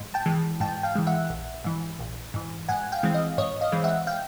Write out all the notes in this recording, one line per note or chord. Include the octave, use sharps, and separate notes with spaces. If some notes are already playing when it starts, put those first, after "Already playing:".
Already playing: G#2
G5 A5
E3 G#3
G#2 G5 A5
F5 G5
E3 G#3
E5 F#5
A#1
G#2 E3
A#1
G#2 E3
G#2 F#5 G#5
F5 G5
E3 G#3 C4
D#5 F5
G#2 C#5 D#5
D#5 F5
E3 G#3 C4
E5 F#5
F5 G5